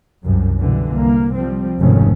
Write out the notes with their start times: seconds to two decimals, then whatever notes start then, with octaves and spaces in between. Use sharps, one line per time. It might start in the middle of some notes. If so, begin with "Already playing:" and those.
0.24 C2 F#2
0.60 B2 D3 E3 G3
0.93 C2 A#3
1.35 F3 G3 C4
1.80 F1 B1 G#2 D#3 A3 C#4